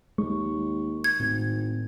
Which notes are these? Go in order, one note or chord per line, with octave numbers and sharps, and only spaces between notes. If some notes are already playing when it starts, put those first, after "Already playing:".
D#2 G#3 C#6
G#6
G#1 A2